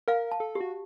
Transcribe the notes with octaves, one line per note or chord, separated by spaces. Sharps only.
A#4 F5
A5
A4
G4
F#4